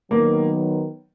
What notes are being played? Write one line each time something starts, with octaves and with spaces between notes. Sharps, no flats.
D#3 F#3 A#3 B3